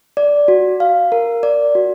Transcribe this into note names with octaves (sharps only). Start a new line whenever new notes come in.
D5
F#4
F5
A#4
D5
F#4